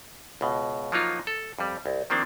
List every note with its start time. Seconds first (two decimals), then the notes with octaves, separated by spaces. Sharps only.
0.41 C#2 B2
0.92 F3 F#3 A#3 D#4 F4
1.27 A4
1.59 F2 G3
1.86 C2
2.10 D#3 F3 A#3 C4 D4